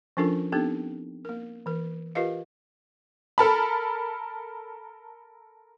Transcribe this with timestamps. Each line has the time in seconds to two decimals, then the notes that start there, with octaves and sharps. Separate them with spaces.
0.17 F3 C#4 D4 F4 A4 A#4
0.52 B3 C4 D4 D#4 G4 A4
1.25 A#3 A#4
1.66 E3 A#4
2.15 F4 G4 A#4 B4 D#5 F5
3.38 A4 A#4 A5 B5